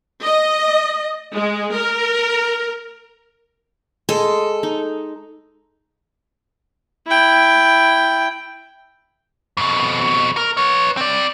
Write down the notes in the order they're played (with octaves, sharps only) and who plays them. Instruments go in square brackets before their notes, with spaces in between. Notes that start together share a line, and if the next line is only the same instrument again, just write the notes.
[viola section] D#5
G#3
A#4
[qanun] G#3 D#5 [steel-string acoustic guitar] A4
[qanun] D#4
[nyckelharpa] E4 G5
[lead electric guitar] F2 B2
A#4
B4 C#5
C4 D5